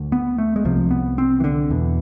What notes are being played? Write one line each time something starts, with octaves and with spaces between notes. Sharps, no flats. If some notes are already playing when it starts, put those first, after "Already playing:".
Already playing: D2 D3
B3
A3
G#3
C2 C3 F3
B3
C4
E3
D3
E2 B2